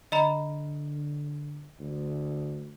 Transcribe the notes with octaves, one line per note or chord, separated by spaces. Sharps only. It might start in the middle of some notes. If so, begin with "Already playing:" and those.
D3 D#5 A#5 B5
D2